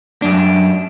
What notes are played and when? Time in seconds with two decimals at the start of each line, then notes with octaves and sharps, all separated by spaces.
0.22 F#2 D4